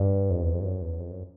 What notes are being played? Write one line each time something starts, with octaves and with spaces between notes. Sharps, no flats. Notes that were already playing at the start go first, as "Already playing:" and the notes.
Already playing: G2
F2
E2
F2
G2
F#2
E2
F2
F#2